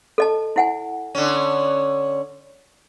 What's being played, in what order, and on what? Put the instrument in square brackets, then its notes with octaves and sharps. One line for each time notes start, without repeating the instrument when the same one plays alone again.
[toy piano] A4 D#5 A5
E4 F#5 G#5
[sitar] D3 C#4